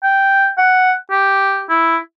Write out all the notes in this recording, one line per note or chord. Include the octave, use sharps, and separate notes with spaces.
G5
F#5
G4
E4